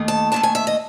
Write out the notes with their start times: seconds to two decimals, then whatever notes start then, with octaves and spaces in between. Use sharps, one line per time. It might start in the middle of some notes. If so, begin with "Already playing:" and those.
Already playing: D#2 D#3 A3
0.08 A5
0.32 D#2 D#3 A3 A5
0.43 G#5
0.55 E5
0.67 D#5